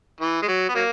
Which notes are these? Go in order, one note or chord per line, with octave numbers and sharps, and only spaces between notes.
E3
G#3
F#3
B3
F#3 A#3